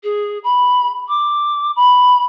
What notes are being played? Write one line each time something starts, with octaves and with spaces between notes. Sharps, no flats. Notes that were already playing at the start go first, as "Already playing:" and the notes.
G#4
B5
D6
B5